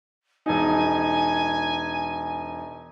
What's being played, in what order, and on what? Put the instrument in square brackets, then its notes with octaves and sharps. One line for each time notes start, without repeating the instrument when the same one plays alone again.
[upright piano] E1 D#4 [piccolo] G#5